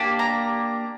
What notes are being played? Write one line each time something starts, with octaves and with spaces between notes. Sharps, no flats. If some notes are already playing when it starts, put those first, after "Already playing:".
Already playing: A#3 D4 G4
A#5